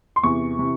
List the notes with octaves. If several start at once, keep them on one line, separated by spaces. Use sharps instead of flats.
C6
E2 C3 E3 C#6
C3 E3